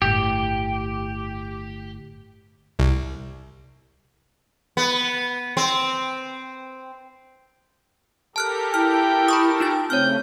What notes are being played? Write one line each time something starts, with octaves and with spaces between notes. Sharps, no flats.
G1 A2 G4
C2
B3
C4
G4 A4 A#4 A5 F6 F#6
E4 G5 F6
B5 C#6 D#6
D#4 F4 G5 A6
C#3 A3 C4 C#5 F6 G6